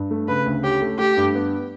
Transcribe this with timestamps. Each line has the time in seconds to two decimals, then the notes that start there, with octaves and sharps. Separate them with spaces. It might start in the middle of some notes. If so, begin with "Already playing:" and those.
Already playing: G2
0.11 A3
0.28 C#3 B4
0.46 D2
0.63 C#4 G4
0.82 A3
0.99 A3 G4
1.17 G2
1.35 B3